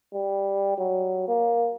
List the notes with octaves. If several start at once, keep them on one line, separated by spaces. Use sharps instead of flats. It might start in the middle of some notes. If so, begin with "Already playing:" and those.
G3
F#3
A#3